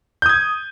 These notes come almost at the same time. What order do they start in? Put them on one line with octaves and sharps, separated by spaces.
G6 D#6 G#6